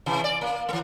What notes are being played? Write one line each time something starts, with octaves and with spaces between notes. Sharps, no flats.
C3 E3
D5
A#3
E3 A3